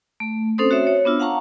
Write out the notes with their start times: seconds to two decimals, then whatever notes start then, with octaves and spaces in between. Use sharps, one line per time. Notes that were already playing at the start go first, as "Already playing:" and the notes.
0.20 A3
0.58 C4 C#4 A4 C5 C6 D#6
0.71 F#4 C#5 E5
0.87 C#5
1.05 B3 D4 F4 E6
1.20 F5 F#5 A5 A#5 C#6